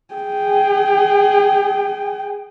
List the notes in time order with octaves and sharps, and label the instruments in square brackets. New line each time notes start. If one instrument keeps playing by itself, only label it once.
[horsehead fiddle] G#4 G5